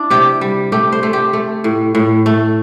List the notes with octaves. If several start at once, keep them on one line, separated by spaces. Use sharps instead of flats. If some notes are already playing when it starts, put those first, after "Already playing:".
Already playing: D4 E4
C3 G4
G3
A3 G4
C5
A3
G4
A3
A2
A2
A3